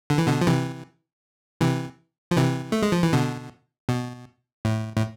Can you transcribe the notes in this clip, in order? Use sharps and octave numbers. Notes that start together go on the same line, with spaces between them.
D3
E3
B2 D3
F3
C3 E3
C3 E3
F3
C3 E3
A3
G#3
F3
E3
B2 D3
B2
A2
A2